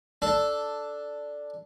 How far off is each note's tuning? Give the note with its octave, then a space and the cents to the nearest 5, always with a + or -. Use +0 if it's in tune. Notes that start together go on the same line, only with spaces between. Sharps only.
D4 +0 A4 +0